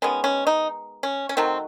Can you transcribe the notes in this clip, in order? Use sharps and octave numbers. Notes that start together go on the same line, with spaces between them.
D#3 G#3 B3 C#4
C#4
D#4
C#4
C#4
D#3 F#3 A3 C4